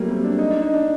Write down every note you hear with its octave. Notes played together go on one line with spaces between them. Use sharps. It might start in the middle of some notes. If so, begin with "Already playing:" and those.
Already playing: F#3 G3 A3 A#3
C4
D4
D#4
D4
D#4
D4